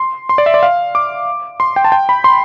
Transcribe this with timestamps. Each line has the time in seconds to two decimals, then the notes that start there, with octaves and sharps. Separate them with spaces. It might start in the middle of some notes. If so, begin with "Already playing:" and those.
Already playing: C6
0.29 C6
0.38 D5
0.46 E5
0.54 D5
0.63 F5
0.95 D6
1.60 C6
1.76 G5
1.85 A5
1.92 G5
2.09 B5
2.24 C6